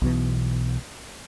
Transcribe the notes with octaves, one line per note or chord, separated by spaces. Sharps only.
B1 B2 E3